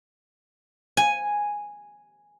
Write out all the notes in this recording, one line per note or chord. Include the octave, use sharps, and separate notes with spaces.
G#5